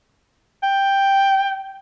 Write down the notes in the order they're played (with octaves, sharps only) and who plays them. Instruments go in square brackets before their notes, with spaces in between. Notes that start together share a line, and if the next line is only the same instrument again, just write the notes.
[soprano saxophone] G5